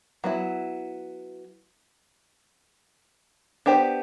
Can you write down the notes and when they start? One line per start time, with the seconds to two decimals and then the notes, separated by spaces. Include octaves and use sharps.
0.24 F#3 B3 E4
3.66 B3 D4 G4 C5